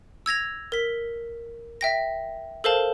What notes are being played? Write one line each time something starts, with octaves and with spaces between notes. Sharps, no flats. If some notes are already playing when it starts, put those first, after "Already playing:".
E6 G#6 A#6 F7
A#4 B6
E5 G5 A#6
A4 A#4 C5 F5 A5